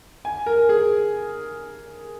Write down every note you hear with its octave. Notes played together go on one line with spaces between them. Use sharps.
G#5
A#4
G#4